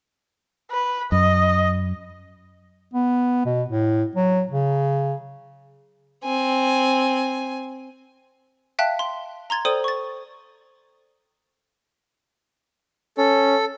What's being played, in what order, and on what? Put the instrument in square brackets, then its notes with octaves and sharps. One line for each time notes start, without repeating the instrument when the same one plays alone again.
[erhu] B4
[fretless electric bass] F#2 [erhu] D#5
[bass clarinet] B3
B2
A2
F#3
C#3
[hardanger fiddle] C4 G#5
[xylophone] E5 F5 G5 A5 F#6 B6
C6
A#5 C6 G#6 A6
A4 C5 D5 G5 D#6 D#7
C#6 A6
[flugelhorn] C#4 [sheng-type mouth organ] A4